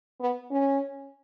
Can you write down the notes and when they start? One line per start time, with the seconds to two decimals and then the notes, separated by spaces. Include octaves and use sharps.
0.20 B3
0.51 C#4